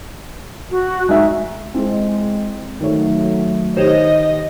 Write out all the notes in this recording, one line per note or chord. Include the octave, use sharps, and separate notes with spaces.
F#4
G#3 D#4 E5
G#3 C4 E4
D#3 F#3 A3 C#5
D#3 G4 C5 C#5 D#5